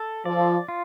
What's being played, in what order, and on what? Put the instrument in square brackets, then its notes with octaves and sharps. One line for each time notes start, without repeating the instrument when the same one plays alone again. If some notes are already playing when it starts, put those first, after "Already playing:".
Already playing: [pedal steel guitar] A4
[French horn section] F3 [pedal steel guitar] D5
[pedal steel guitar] F4